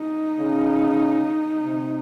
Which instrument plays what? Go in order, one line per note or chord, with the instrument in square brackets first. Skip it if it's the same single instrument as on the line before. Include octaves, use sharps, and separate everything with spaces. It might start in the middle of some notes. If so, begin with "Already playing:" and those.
Already playing: [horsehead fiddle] D#4
[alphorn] C#3
C3